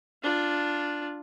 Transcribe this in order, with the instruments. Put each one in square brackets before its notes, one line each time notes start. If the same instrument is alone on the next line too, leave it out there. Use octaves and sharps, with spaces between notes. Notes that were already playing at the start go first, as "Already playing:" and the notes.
[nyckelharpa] D4 F4